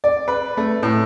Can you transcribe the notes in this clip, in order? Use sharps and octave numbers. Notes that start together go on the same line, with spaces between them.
D5
B4
A3
A2